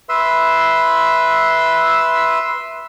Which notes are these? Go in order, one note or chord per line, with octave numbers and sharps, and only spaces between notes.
B4 E5 C6 E6